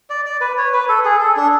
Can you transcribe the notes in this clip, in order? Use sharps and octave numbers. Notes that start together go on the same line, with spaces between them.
D5
D5
B4
C#5
B4
A4
G#4
A4
D4